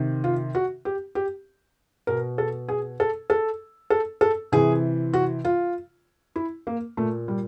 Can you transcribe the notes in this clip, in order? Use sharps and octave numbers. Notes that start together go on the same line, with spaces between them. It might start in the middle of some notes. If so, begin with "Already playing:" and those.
Already playing: C3 D#3
F4
F#4
G4
G4
B2 A#4
A4
G#4
A4
A4
A4
A4
C3 E3 G#4
F#4
F4
E4
A#3
A#2 A3
G3